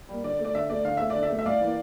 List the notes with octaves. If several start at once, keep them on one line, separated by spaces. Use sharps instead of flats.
G3 A#3
D3 D5
A3
D5
D3 E5
A3 D5
D3 F5
A3 E5
D5
D3
E5
A3
E5
A2 D5 F5
E3 A#3